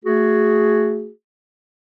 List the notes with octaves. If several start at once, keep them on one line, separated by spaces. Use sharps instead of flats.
A3 F#4 G#4